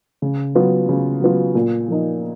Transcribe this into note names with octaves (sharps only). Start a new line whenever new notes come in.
C#3
F#3 B3 F4
C#3
F#3 B3 F4
A#2
F3 A#3 D#4